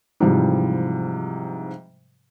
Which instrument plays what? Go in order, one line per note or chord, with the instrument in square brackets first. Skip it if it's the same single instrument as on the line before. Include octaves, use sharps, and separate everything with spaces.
[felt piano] G#2 C3 E3 F3 G3